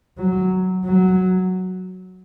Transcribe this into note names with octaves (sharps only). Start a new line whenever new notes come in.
F#3
F#3